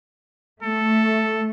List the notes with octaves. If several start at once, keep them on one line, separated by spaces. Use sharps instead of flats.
A3 A4